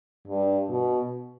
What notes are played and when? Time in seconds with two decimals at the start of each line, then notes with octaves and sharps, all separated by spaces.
0.27 G2
0.69 B2